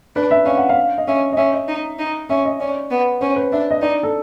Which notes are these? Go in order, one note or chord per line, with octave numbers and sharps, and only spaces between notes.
D4 B4
E5
C#4 F5
F#5
F5
D#5
C#4 E5
D#5
C#4 E5
D#5
D#4
D#4
C#4 E5
D#5
C#4 D5
B3
C#4 C5
B4
D4 E5
D#5
D#4 D5
A4